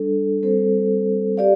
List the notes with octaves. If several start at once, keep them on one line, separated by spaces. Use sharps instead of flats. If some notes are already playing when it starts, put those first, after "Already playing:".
Already playing: G3 D4 A4
G3 C4 A4 C5
G4 D5 F5